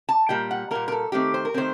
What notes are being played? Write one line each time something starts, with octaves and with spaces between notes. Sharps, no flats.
A5
A#2 G3 A#3 G5
F#5
A#2 G3 A#3 A#4
A#4
A4
D#3 A3 C4 G4
C5
A#4
D#3 A3 C4 C5